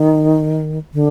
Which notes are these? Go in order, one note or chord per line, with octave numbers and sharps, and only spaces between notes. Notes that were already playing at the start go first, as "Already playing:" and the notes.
Already playing: D#3
D3